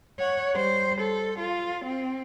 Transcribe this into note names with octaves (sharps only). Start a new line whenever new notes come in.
C#5 F#5
G3 C5
A4
F4
C4